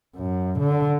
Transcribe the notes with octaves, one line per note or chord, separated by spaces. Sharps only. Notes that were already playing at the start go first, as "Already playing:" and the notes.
F#2
D3